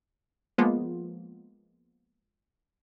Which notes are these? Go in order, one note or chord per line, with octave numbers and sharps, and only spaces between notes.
F3 G#3 A#3 B3 F4